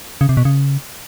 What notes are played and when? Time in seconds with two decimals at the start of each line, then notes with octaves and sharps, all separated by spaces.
0.21 C#3
0.29 C3
0.37 B2
0.45 C#3